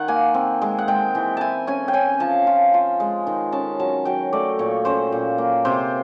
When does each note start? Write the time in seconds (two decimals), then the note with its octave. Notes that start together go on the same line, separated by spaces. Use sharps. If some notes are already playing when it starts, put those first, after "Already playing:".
Already playing: D#3 F#5
0.08 A#3 G#5
0.34 C4
0.62 G#3
0.79 F#5
0.88 G#3 G5
1.15 E3
1.37 E4 G#5 A5
1.67 C#4 G#5
1.88 G5
1.93 C#4 G#5
2.20 F3 A5
2.47 F4
2.74 F4
3.00 G#3
3.27 D#3
3.52 C#4 A5
3.80 F#3 A5
4.05 F#3 G5
4.33 A3 D5
4.59 A#2 C#5
4.85 C#4 C5
5.12 A#2
5.38 A#3
5.65 C3 C5